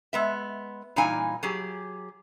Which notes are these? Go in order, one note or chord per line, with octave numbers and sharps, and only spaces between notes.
G#3 B3 E5
A#2 E3 G3 D#4 F5 G#5
F#3 G4 G#4